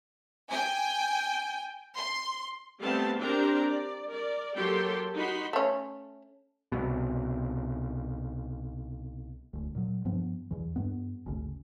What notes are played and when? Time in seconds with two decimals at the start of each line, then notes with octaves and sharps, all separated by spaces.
0.50 G5 G#5
1.98 C6
2.81 G3 A3 B3 C4 F5 A5
3.20 C4 D4 G4 A#4 C5 A#5
3.66 D5
4.09 A#4 D5
4.54 F#3 A#3 G4 A4 G5 C6
5.15 D#4 F#4 B5 C6
5.53 A3 C#4
6.72 C2 B2
9.53 E1 D2
9.75 A#2 F#3
10.05 G2 F3 B3
10.51 E2 E3
10.76 G2 B3
11.26 G#1 D2 C#3